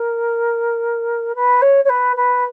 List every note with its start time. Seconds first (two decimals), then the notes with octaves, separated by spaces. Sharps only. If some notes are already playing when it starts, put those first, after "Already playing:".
Already playing: A#4
1.35 B4
1.61 C#5
1.84 C#5
1.89 B4
2.16 B4